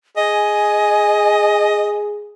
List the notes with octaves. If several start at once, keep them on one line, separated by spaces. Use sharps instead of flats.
G#4 D#5 G#5